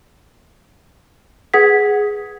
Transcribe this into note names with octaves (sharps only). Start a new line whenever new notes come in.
G#4 B4 F#5 G#6 B6